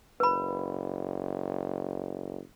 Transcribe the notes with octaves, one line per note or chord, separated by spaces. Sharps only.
F#1 B4 B5